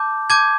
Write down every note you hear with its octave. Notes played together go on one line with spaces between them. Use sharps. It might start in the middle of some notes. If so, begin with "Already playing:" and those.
Already playing: A5 D6 G6
A5 D6 G6 G#6